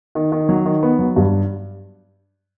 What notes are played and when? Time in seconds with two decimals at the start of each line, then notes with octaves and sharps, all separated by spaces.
0.15 D#3
0.32 D#3
0.49 F#3
0.66 D#3
0.83 B3
0.99 F#3
1.16 G2